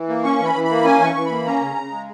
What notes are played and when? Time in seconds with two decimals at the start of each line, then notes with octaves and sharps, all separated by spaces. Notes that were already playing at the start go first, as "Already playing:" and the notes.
Already playing: E3
0.09 A#3
0.24 C#4 C#6
0.39 E3
0.44 B5
0.54 E3
0.64 B5
0.70 A#3
0.84 C#4 G#5
1.00 E3 C#6
1.15 E3
1.26 A#3 B5
1.45 C#4 A#5
1.61 C#3
1.76 C#3
1.91 G#3